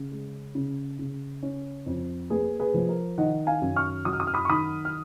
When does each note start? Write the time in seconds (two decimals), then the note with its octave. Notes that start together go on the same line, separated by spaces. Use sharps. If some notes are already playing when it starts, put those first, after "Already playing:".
Already playing: C#3
0.11 G#3
0.55 C#3
0.99 C#3
1.43 C#4
1.86 F2
2.30 A#3 G#4 B4
2.60 G#4 B4
2.74 F3
2.89 A#4
3.18 D#3 D#5 F#5
3.47 F5 G#5
3.62 F#2
3.76 C#6 F6
4.05 F#3 D#6
4.13 F6
4.20 D#6
4.27 F6
4.34 B5 D#6
4.45 C#6
4.49 D#3 B5 D#6
4.85 F6